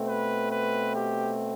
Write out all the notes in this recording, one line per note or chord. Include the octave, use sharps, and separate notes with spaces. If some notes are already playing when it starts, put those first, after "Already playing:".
Already playing: B2 A3 C4
B4
B4
G4